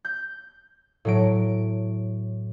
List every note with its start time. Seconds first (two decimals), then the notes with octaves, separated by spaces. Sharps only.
0.05 G6
1.05 A2 F#3 D7